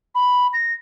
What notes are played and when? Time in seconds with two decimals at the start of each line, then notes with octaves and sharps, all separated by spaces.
0.15 B5
0.53 A#6